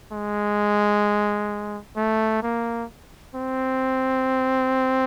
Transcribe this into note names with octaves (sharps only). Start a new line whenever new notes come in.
G#3
A3
A#3
C4